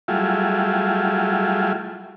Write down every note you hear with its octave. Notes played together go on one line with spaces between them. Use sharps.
F#3 G3 A3 E4 F4 G#4